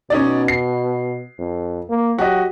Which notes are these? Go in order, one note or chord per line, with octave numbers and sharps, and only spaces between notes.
B2 C#4 D#4 D5
C7
F2
A#3
F#3 F#4 G4 D#5